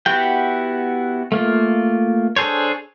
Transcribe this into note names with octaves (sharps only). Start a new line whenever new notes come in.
B3 E4 F#4 G4 G5
A3 A#3 F4
D4 G#4 A4 C5 C#5